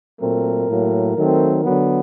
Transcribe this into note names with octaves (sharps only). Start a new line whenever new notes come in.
A#2 F#3 A3 C4 A#4
A2 F#3 A#3
D#3 F#3 A3 C4
D3 F#3 B3